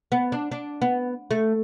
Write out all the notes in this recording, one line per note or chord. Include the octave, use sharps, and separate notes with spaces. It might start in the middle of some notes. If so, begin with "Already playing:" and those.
B3
D4
D4
B3
A3